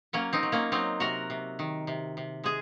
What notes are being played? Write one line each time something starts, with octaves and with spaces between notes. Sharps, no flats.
F#3 A#3 C#4
C4 D#4
F#3
A#3 C#4
F#3 C4 D#4
C3 F#4 A#4
C3
D#3
C3
C3
G#3 G#4